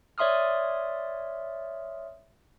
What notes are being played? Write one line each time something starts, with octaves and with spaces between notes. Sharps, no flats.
C#5 D5 E5 C6 D#6 F6